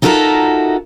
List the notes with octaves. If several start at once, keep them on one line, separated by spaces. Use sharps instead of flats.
D#4 F4 F#4 A4 A#4 E5